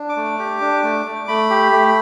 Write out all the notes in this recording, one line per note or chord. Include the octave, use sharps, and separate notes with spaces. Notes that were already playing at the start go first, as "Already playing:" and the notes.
Already playing: D4
D6
A3
G4
D4
A3
A3
A3 B5
G4
A3